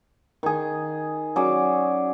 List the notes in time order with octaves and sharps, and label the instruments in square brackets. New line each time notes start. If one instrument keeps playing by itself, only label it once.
[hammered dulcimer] D#3 G#4
F#3 C#4 G#4 D5